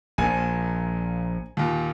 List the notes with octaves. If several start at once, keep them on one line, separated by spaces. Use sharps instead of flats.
A#1 A#2 G#5
D#2 A#2